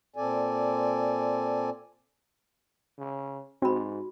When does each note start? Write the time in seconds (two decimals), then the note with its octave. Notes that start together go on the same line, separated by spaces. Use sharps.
0.16 A#2 C4 A4 D5 G#5
2.98 C#3
3.62 G#2 C4 F#4 B5